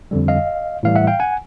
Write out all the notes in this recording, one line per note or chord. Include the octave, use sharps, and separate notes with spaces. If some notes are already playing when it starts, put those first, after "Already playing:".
F2 D3 G3
D#5 F5
A2 E3 G3 F5
E5 F#5
F5 G5
F#5 G#5